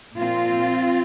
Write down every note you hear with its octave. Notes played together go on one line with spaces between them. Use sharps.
A#2 F3 C4 F4